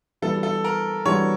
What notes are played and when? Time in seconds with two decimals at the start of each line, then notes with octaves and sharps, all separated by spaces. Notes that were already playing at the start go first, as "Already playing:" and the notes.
0.22 E3 G3 B3 D4 F#4 A4
0.43 A4
0.64 A#4
1.05 E3 G3 B3 D4 F#4 C#5